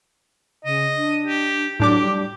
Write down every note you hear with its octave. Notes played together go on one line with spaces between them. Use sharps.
C#3 D#5
D4
G4
A2 F#3 D4 G4 D6
G3